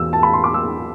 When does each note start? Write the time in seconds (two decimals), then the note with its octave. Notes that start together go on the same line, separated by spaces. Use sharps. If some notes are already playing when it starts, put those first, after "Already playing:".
Already playing: E2 B2 E6
0.13 A5
0.23 B5
0.33 C6
0.44 D6
0.54 E6